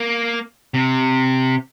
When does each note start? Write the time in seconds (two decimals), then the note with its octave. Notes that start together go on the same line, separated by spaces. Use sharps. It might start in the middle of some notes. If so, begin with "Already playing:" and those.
Already playing: A#3
0.74 C3